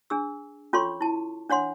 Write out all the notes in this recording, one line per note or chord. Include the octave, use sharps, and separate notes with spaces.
D4 G#4 E6
C#4 F4 A4 C#5 C6 C#6
E4 A5
D4 C#5 F#5 C6